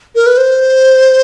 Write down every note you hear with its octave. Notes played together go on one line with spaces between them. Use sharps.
A#4
B4
C5